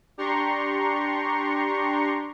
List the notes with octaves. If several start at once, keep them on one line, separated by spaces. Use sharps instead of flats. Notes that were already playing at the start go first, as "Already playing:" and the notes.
D4 G4 A#5 C6 C#6